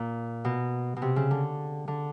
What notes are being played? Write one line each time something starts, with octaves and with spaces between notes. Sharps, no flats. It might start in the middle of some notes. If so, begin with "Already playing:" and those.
Already playing: A#2
B2
B2
C3
C#3
D3
D3